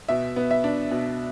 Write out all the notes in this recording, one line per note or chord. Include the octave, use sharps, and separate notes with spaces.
B2 E5
B3
E5
D4
B2